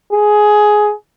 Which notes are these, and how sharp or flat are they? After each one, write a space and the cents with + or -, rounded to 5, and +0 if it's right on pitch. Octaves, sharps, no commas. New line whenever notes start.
G#4 +10